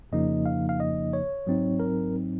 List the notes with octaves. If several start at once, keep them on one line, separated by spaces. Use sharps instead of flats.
F2 C#3 F3 A#3 D#4 D#5
F5
F5
D#5
C#5
G#2 F#3 C4 D#4
A#4